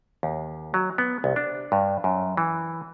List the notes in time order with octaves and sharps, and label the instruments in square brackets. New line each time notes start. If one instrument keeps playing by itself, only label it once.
[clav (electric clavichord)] D#2
F#3
B3
C2
D4
G2
F#2
E3